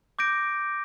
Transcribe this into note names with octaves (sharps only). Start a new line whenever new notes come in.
D6 G6 A#6 D7